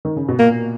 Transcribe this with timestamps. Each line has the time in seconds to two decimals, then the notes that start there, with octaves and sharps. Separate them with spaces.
0.05 D#3
0.16 C#3
0.29 B2
0.39 A#2 A#3